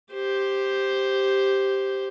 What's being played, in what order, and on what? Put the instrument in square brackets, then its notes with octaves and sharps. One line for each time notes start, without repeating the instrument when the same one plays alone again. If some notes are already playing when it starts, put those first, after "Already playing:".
[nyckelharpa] G4 C5